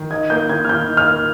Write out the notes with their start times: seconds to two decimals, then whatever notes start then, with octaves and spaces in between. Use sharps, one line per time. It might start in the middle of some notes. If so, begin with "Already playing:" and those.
Already playing: D#3
0.10 D#4 G#6
0.30 A#3 G6
0.49 D#3 G#6
0.65 F6
0.69 D#3 G6
0.88 D#4
0.97 F6
1.07 A#3